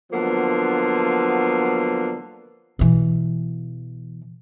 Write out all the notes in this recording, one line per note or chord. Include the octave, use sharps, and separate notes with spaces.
D3 F3 F#3 A#3 B3
B2 E3